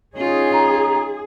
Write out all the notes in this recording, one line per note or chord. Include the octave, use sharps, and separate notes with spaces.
C#4 D#4 F4 G#4
A#5